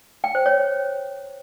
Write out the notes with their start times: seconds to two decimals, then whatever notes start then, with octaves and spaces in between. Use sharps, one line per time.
0.24 G5
0.35 C5
0.46 C#5